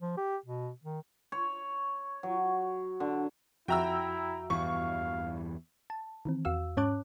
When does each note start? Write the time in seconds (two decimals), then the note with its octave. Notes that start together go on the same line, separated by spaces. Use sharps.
0.01 F3
0.17 G4
0.46 B2
0.84 D#3
1.32 C#5
2.23 F#3
3.00 D3
3.68 F2 E4 F#4 E5 G5 A#5 E6
4.50 E2 G2 E3 F5 C#6
5.90 A5
6.25 D#3 E3 C4
6.45 E2 F#4 F5 E6
6.77 G#2 C#4 C#5 A5 D6 F#6